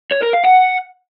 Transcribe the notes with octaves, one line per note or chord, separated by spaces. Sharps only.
C#5
A#4
F5
F#5